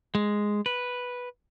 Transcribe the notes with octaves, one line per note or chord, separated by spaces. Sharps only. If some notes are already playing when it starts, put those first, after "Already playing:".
G#3
B4